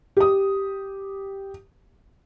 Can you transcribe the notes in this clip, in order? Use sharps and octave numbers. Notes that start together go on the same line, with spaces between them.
G4 D#6